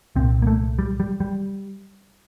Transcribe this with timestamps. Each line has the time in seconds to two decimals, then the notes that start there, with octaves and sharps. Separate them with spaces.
0.16 C2 A#2 C4
0.42 A#3
0.47 A3
0.79 G3
1.00 G3
1.20 G3